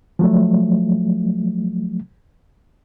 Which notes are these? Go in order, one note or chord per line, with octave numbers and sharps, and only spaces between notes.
F3 F#3 A3